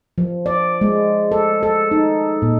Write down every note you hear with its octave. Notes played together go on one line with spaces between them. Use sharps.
F3
D5
G#3
A4
A4
D#4
A#2